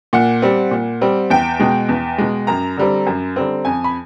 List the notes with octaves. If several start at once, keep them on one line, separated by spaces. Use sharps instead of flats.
A#2 F#5
G3 C4
A#2
G3 C4
E2 G5
B2 G#3
E2
B2 G#3
F#2 A#5
D3 G3 C4
F#2
D3 G3 C4
F2 G#5
B5